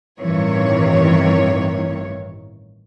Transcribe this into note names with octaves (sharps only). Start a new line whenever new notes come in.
A1 G2 C3 D#3 E3 C#5